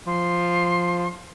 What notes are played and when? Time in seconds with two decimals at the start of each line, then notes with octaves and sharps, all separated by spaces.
0.07 F3 C6